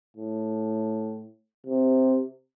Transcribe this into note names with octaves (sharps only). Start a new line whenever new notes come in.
A2
C3